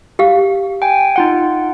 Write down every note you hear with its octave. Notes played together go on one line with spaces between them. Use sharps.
G4 F5
G5 G#5
D#4 F4 F#5